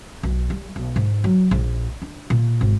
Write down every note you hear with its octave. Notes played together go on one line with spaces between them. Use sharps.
B1
G3
B1
G#2
F#3
A#1
D4
A#2
G#1